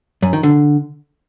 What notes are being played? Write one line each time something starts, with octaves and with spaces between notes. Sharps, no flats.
F#2
D#3
D3